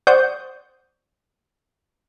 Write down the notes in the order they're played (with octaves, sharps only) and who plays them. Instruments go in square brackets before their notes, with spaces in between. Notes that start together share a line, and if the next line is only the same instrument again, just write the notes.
[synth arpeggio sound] C5 D5 F#5 C#6 D#6 G6